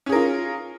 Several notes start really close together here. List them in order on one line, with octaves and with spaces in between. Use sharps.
C#4 G#4 A#4 F4